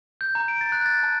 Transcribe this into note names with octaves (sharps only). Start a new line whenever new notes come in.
G6
A#5
D7
A6
F#6
A6
A5